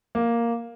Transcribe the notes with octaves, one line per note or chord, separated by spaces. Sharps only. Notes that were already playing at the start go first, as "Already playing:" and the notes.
A#3